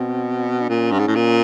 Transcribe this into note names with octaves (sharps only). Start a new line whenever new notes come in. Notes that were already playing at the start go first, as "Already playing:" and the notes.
Already playing: B2 C4
D4
A#2 C#4
G2
G#2
A2
A#2